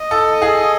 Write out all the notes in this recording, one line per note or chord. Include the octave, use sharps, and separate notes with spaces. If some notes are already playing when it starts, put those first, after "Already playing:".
Already playing: D#5
A4
G#4